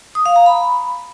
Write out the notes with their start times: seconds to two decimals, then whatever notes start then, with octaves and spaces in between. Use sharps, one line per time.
0.15 D#6
0.26 F5
0.36 A#5
0.46 B5